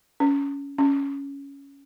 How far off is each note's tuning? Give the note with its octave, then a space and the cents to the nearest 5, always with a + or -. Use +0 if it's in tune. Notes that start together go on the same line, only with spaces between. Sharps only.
C#4 +20
C#4 +10